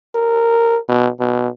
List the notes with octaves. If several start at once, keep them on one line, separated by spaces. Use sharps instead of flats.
A#4
B2
B2